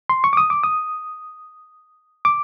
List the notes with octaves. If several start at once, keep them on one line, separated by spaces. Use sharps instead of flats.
C6
C#6
D6
D#6
D6
D#6
D6